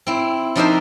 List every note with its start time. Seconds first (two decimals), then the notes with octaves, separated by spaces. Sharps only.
0.07 C4 E4
0.55 F3 D4 D#4 A#4 C5 E5